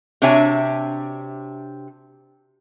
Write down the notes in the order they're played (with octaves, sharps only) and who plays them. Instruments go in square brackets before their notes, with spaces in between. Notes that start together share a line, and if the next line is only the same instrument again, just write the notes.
[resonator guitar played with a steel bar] C3 D4 F#4 C#5 E5 G#5